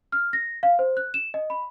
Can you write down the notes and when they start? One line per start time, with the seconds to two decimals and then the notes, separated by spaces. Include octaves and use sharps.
0.12 F6
0.33 A#6
0.63 F5
0.79 C5
0.97 F#6
1.14 E7
1.34 D#5
1.50 B5